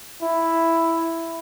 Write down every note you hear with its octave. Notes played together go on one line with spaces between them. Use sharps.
E4